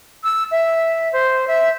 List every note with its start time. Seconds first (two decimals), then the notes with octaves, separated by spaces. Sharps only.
0.24 E6
0.51 E5
1.13 C5
1.48 E5